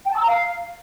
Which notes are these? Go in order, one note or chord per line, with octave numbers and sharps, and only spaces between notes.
G5
A5
E6
A#5
F5